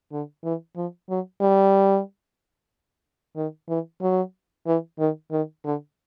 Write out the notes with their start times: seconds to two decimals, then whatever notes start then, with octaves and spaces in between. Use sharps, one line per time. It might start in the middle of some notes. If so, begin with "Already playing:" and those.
0.12 D3
0.44 E3
0.76 F3
1.10 F#3
1.41 G3
3.36 D#3
3.69 E3
4.01 F#3
4.66 E3
4.99 D#3
5.31 D#3
5.65 D3